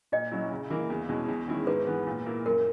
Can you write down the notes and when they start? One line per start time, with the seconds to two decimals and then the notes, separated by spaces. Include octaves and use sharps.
0.12 A#2 D#5
0.32 F#3 C#4 E4
0.52 C#3
0.70 E3 A#3 E4
0.90 E2
1.09 B2 G#3 C#4 E4
1.28 E2
1.48 D#3 G#3 C#4 E4
1.67 G#2 B4
1.87 E3 B3
2.07 A#2
2.26 A#3 E4
2.45 F#2 A#4